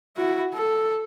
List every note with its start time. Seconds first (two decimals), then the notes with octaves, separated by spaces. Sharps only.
0.16 E4 F#4
0.54 A4